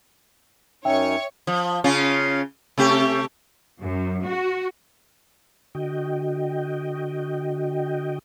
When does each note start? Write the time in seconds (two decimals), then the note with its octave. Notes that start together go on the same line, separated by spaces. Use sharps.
0.85 F#2 C#4 D#4 C#5 E5 G5 C#6
1.47 F3
1.84 C#3 C#4 F4
2.78 C3 A3 G4
3.81 F#2
4.25 F#4
5.75 D3 F#4 D#5 G5